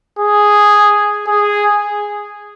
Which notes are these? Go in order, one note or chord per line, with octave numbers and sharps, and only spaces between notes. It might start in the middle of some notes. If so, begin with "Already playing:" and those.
G#4
G#4